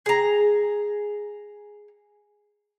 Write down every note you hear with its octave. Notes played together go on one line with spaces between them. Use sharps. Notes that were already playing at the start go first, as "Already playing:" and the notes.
G#4 A#5